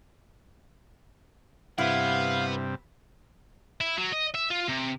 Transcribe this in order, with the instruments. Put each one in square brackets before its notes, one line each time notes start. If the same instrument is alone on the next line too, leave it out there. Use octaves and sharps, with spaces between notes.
[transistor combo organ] G2 C3 [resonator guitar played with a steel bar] E4 [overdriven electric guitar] B4 F#5 [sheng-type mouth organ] F5
[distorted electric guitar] E4
F#3
D#5
E5
F4
C3